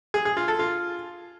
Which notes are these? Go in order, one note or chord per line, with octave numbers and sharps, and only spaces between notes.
G#4
G#4
F4
A4
F4